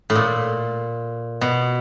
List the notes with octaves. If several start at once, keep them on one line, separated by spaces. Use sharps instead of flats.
A2
A#2
B2